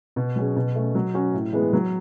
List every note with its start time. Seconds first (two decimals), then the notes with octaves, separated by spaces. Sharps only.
0.16 B2
0.36 F#3 C#4 G#4
0.56 B2
0.76 A3 C#4
0.95 F#3
1.14 C#4 F#4
1.34 A2
1.53 E3 G#3 B3
1.73 F#3